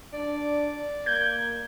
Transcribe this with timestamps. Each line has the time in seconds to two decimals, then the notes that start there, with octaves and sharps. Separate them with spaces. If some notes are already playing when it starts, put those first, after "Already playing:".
0.14 D4 D5
1.06 A#3 G6 G#6